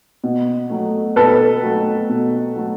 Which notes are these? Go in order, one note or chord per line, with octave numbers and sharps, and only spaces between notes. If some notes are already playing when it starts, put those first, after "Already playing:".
B2
F#3 A3
B2 A4 B4
F#3 A3
B2
F#3 A3